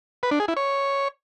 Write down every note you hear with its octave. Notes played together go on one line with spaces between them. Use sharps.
B4
D4
G#4
E4
C#5